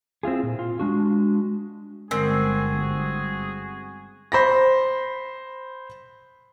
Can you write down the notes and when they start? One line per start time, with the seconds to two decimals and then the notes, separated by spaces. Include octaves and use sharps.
0.23 C4 E4 F4 G#4
0.43 A#2
0.59 F4
0.80 G#3 D4 F#4
2.11 G1 D3 G#3 C4 F#4 G#4 A#4
4.32 C5 B5 A#6